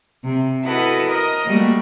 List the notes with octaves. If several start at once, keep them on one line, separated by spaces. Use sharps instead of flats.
C3
E4 F#4 A4 B4 D#5 F#5
A#4 D#5 D#6
G3 A3 A#3 F#4